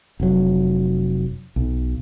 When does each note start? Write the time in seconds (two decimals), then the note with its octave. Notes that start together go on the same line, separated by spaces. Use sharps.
0.20 F1 F#3
1.56 B1